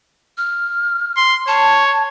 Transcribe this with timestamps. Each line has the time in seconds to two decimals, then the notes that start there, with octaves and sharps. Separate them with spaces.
0.37 F6
1.17 C6
1.48 C#5 A5